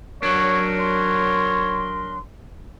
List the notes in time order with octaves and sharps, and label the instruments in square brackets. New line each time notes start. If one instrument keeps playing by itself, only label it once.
[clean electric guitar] F#3 D4 [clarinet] A#4 [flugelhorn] C#5
[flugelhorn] C#5 [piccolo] C6